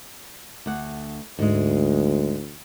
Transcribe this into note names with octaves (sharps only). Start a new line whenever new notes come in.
D2 F#5
D2 G#2 G#3